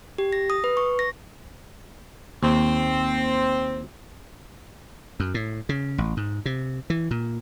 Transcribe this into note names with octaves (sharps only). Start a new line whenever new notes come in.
G4
A#6
D#6
B4
C#6
A#6
D#2 C4
F#2
A2
C#3
A1
G#2
C3
E3
A#2